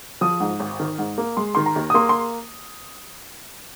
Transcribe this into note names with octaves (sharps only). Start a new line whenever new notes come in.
F3 D#6
G#2
G#1
D#3
G#2
A#3
G#3 C6
D#3 C6
A#5
D#2
D#6
A#3 C6
C6